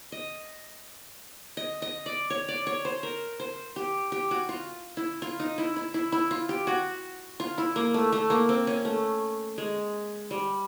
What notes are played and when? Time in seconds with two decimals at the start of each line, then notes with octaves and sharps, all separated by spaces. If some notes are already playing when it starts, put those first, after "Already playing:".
0.12 D#5
1.57 D#5
1.82 D#5
2.06 D5
2.30 C#5
2.48 D5
2.67 C#5
2.85 C5
3.03 A#4
3.40 C5
3.76 G4
4.12 G4
4.31 F#4
4.49 F4
4.97 E4
5.22 F4
5.40 D#4
5.58 E4
5.76 E4
5.94 E4
6.12 E4
6.31 F4
6.49 G4
6.67 F#4
7.40 F4
7.58 E4
7.76 A#3
7.94 A3
8.13 A3
8.30 A#3
8.49 C4
8.67 C#4
8.85 A3
9.58 G#3
10.31 G3